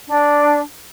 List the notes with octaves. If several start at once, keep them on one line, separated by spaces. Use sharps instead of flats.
D4